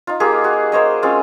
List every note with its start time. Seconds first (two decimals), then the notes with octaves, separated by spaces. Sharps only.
0.07 D#4 F4
0.20 A#3 F4 G4 G#4
0.44 F#4
0.72 A#3 C5 C#5 D#5
1.03 G#3 C4 C#4 F4